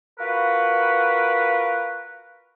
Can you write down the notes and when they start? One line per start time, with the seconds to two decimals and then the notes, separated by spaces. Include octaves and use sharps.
0.18 F4 F#4 A#4 B4